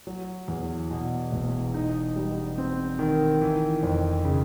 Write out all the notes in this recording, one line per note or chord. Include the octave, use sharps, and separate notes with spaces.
F#3
E2
B2
E1
D#4
G3
C4
D#3
E3
F2
C#3